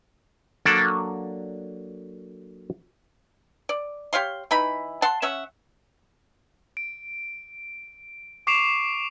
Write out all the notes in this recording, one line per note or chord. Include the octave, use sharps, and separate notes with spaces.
F#3 A#3 D4 A4 D5
D5
G4 C#5 F5 C6
E3 D#4 B5
F#5 A5 C6
C#4 C#5 E5 F#5
D7
C#6 D6 C7 D7 E7 F7